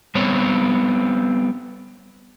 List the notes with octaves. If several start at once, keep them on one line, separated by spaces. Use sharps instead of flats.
G3 B3 C4 C#5